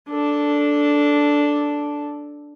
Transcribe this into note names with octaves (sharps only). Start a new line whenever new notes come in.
D4 A4